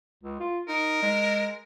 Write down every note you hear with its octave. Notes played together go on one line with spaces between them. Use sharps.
C#2
F4
D#4 A#4
G#3